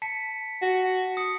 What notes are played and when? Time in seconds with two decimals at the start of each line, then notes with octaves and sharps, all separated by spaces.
0.02 A5 B6 C#7
0.62 F#4
1.17 D#6 C#7